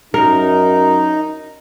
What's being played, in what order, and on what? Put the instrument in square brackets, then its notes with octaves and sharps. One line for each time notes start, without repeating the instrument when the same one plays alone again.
[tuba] F#2 [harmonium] D#4 [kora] A#4